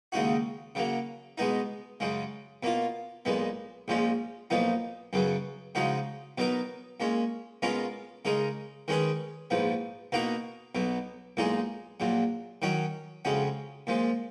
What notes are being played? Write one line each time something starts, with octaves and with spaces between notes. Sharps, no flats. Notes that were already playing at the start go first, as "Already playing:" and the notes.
D#2 C#3 G#3 D#4 F#4
C#3 F#3 A#3
B2 G#3 B3 D#4
F#2 C#3 G#3
B2 A#3 F4
B1 A#2 G#3 B3
A#1 A#2 F3 G#3 C#4
B1 A#2 F3 B3 D#4
F#2 C#3 F#3 B3
C#3 F3 G#3 D#4 F#4
B2 F#3 B3 D#4 A#4
A#2 G#3 C#4
B2 G#3 C#4 F4 A#4
C#3 G#3 D#4 A#4
D#3 G#3 C#4 G#4 B4
A#1 G#2 F3 B3
B2 A#3 D#4 F#4 A#4
B1 B2 F#3
B1 A#2 G#3 D#4 G#4
A#1 A#2 F#3
D#3 F#3 C#4 F#4
F2 C#3 G#3 C#4 F#4
A#2 F3 G#3